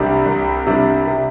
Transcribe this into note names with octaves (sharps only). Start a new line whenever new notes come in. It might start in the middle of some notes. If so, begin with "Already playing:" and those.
Already playing: C2 C3 G3 D4
C2
C3 G3 D4
C3